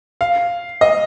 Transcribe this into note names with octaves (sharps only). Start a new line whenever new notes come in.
F5
D#5